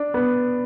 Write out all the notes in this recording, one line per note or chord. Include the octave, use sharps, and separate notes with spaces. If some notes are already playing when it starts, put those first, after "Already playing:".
Already playing: D4
B3